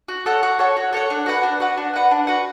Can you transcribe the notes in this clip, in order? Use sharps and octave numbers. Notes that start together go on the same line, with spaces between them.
F#4
A4 C#5 F#5
F#4
A4 C#5 F#5
F#4
A4 C#5 F#5
D4
F#4 B4 F#5
D4
F#4 B4 F#5
D4
F#4 B4 F#5
D4
F#4 B4 F#5